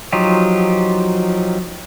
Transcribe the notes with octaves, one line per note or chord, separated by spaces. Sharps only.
F3 F#3 D#4 F4 G4